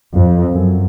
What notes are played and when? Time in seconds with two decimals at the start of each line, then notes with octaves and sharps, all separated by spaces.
0.16 F2
0.53 F#2